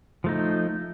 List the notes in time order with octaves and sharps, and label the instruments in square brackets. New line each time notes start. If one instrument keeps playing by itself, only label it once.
[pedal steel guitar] F3 A3 D#4